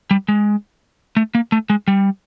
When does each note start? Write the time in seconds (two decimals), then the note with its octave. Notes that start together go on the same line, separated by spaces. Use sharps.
0.11 G3
0.28 G#3
1.17 A3
1.35 A#3
1.52 A3
1.70 G#3
1.88 G3